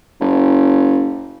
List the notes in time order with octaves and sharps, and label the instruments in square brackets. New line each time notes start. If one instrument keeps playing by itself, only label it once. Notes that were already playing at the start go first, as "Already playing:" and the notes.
[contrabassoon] F#1